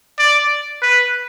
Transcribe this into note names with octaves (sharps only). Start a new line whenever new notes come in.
D5
B4